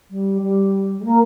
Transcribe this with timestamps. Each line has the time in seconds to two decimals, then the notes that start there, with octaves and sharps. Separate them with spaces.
0.10 G3
0.42 G3
0.99 G#3
1.04 A#3